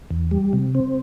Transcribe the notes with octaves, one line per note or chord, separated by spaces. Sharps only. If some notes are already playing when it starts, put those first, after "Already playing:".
E2
G3
C3
C4